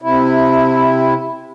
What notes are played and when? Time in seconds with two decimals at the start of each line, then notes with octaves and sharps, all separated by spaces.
0.02 C3 E4